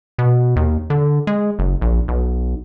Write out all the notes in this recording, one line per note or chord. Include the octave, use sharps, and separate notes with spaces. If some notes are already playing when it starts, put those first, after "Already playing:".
B2
D#2
D3
G#3
F#1
A#1
B1